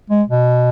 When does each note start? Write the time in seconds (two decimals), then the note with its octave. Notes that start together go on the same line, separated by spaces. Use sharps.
0.10 G#3
0.29 B2